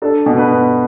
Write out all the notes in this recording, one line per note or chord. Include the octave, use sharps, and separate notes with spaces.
D4 A4
B2
B4
B3